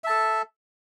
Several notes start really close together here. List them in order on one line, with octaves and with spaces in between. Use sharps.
E5 A5 A4